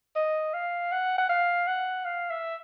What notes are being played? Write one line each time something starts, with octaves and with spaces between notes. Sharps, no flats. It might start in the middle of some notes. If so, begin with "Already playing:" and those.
D#5
F5
F#5
F#5
F5
F#5
F5
E5